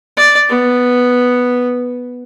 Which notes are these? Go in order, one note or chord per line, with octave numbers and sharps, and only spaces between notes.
D5
B3